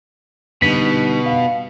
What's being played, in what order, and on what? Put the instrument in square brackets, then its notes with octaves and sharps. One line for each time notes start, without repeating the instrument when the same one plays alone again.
[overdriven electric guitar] B2 [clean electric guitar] D3 G3 D#4 [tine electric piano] B6
[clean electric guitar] F5